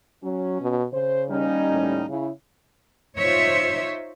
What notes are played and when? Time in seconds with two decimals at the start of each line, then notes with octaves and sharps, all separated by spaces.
0.23 F#3 C#4
0.61 B2
0.93 C#3 C5
1.29 D#2 G3 C#4 D#4
1.69 A2
2.09 C#3 E4
3.20 D#4 F4 C5 C#5 E5